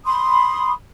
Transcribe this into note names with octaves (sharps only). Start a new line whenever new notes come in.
B5 C6 D#6